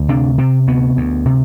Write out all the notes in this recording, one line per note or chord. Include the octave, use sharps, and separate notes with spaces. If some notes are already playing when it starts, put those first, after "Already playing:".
Already playing: D2
C3 D4
C3 C4
D2 B3
D2
C3